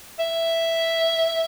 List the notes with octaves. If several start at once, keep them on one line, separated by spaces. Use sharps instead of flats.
E5